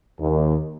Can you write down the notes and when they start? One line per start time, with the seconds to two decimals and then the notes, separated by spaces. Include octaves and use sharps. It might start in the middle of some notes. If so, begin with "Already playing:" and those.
0.20 D#2